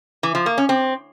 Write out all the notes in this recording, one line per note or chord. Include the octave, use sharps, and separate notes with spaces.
E3
F3
A#3
C#4
C4